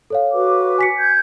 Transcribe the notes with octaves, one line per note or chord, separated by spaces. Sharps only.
A4 C#5 F5
F#4 B4 D6
G#5 B6 C#7
G6 G#6